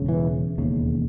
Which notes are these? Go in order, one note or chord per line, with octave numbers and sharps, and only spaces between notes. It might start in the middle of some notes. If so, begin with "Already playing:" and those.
Already playing: E1 C#3
E3
E1 D#2 C#3